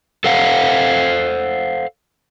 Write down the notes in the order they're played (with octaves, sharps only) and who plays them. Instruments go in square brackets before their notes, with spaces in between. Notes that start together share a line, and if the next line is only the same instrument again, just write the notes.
[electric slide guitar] A4 C5 F5 F#5